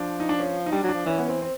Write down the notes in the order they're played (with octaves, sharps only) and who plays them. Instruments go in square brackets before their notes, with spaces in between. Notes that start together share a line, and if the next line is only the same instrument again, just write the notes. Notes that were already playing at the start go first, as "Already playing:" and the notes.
Already playing: [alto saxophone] F3 [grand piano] D4
[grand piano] D#4
D4
C#4
D#4
[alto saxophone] G3 [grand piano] D4
[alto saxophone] F#3
[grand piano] D4
[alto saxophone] F3
[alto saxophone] E3 [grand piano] C#4
[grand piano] B3
[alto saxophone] E3 [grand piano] C4
[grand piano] C4